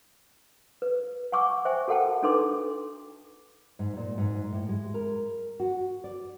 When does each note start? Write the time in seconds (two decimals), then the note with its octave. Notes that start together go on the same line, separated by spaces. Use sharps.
0.82 B4
1.32 F#5 G#5 C#6 D6 E6
1.65 C5 E5 G5 G#5 C#6
1.88 F#4 A4 A#4 F#5 G5 A5
2.22 D4 D#4 A4 B4 C6 D6
3.79 G#2
3.97 A#2
4.18 G#2
4.53 A2
4.69 G#3
4.94 A#4
5.60 F#4
6.04 D5